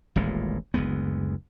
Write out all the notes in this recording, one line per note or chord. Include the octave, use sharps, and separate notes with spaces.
D#1 A1 A#2 G#3
F#1 D2 G#3 B3